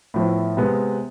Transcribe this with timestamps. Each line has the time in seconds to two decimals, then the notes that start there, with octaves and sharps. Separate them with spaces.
0.14 A2 F3 B3 E4
0.57 C3 G#3 B3